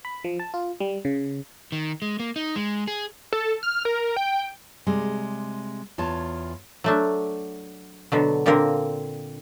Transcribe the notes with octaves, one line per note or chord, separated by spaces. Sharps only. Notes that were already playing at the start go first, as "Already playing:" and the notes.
B5
F3
A5
F4
G3
C#3
D#3
G#3
A#3
D#4
G#3
G#4
A4
F6
A#4
G5
C3 G3 G#3
E2 F4 C#5 A5
F#3 A3 D4
B2 D3 F#3
A#2 D3 A#3 C4 A#4